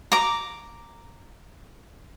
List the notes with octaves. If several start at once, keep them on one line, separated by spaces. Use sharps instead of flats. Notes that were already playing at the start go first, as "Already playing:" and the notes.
A#5 D6